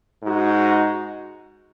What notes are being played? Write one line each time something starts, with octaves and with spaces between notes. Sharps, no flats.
G#2 G#3 D#4 F#4